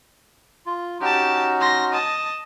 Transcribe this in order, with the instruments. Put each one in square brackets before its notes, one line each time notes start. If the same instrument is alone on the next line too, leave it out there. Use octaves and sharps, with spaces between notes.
[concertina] F4
[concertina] C#4 D#4 F#4 [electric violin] G4 A5
[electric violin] C6 A#6
D#5 A5